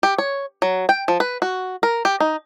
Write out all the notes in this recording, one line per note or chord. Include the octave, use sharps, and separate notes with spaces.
G4
C#5
F#3
G5
F3
B4
F#4
A#4
G4
D#4